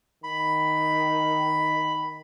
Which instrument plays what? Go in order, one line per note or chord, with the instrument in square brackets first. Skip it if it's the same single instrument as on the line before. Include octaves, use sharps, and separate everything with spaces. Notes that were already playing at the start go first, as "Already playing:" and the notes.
[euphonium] D#3 [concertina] B5